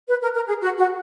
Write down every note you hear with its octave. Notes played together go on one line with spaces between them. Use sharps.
B4
A#4
A#4
G#4
F#4
F#4